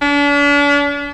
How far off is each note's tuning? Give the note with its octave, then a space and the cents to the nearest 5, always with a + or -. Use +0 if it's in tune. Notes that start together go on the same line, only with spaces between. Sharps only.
D4 -40